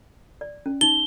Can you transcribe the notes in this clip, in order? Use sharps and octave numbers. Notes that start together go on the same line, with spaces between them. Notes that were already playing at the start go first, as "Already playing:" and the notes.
D5
C#4
D#4 G7